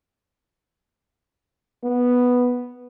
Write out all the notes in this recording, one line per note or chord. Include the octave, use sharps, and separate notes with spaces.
B3